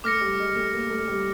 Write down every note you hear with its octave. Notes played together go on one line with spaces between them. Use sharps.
A3 D6 F6 A#6 C#7
G3
G#3
A3
A#3
A3
G3